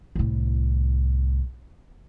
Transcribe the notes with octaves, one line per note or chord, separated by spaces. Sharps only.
C2 A2